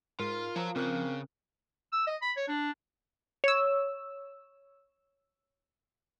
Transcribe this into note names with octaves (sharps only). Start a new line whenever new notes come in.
G#2 F4 A#4
F3 C#5 A#5
C#3 C4 A#4 F#6
E6
D#5
B5
C#5
D4
C#5 E6